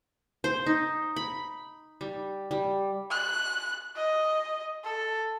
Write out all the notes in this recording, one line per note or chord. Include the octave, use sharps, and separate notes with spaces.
C5
D#4
B5
G3
G3
F#6
D#5
A4